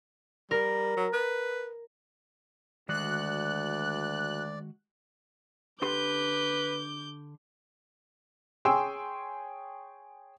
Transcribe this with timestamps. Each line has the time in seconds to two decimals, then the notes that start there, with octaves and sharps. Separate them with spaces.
0.51 G3 A#4
0.97 F#3
1.13 B4
2.89 D2 D#3 G#3 F#4 D5 F#6
5.82 D3 G4 B4 C6 D6 G6
8.65 G#4 C#5 G5 G#5 C6 E6